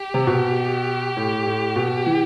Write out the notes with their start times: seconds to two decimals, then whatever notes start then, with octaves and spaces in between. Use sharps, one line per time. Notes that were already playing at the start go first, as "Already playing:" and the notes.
Already playing: G4
0.14 C3
0.27 B2
1.17 A2
1.46 A2
1.76 B2
2.06 E3